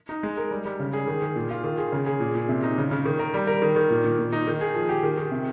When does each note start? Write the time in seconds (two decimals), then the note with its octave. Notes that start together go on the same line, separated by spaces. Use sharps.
0.09 D#4
0.23 G#3
0.37 A#4
0.51 G3
0.66 G3
0.80 C#3
0.93 G#4
1.08 D#3
1.22 D#3
1.36 A#2
1.50 F4
1.64 D#3
1.78 G#4
1.92 C#3
2.06 G#4
2.20 A#2
2.35 A#2
2.49 C3
2.63 D#4
2.78 C#3
2.91 C#3
3.06 D#3
3.19 A#4
3.34 G3
3.47 A#4
3.62 D#3
3.76 D#3
3.90 A#2
4.04 A#2
4.19 A#2
4.32 D#4
4.47 D#3
4.61 G#4
4.75 F3
4.89 G4
5.03 D#3
5.18 D#3
5.31 C3